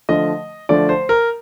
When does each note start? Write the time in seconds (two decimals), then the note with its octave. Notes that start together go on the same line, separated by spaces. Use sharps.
0.09 D3 F3 A3 D#5
0.69 D3 F3 A3 D5
0.89 C5
1.09 A#4